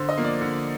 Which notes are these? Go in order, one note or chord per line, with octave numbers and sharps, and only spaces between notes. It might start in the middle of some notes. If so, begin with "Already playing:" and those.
Already playing: D3 C5
D#5
F3 A#3
D5
D3